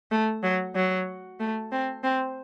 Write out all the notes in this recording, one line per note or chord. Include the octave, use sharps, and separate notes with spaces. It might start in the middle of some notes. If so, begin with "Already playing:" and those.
A3
F#3
F#3
A3
C4
C4